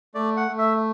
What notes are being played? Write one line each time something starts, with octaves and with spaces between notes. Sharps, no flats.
A3 D5
F#5
A3
E5